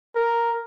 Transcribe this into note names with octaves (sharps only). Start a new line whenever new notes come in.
A#4